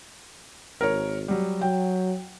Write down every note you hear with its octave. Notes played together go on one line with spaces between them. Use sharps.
G#1 A#4 C#5
F#3 G3
F#3 G5